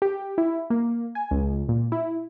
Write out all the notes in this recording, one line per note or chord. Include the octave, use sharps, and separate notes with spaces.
G4
E4
A#3
G#5
C#2
A#2
E4